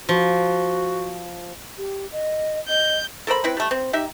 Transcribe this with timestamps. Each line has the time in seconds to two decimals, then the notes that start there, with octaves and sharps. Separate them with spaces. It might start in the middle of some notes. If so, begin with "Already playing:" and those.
0.09 F3 F#4
1.77 G4
2.12 D#5
2.68 D#5 G6
3.27 A4 A#4 C5 B5
3.44 C4 E4 B4
3.57 G3 A3
3.71 C4
3.93 D#4 G4 E5